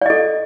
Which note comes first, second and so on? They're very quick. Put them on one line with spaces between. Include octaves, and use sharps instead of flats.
D5 D#5 A4